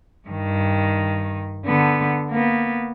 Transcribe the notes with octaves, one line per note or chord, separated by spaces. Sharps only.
G2 D#3
D3 B3
A#3 B3